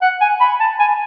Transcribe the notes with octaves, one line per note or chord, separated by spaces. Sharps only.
F#5
G#5
B5
A5
G#5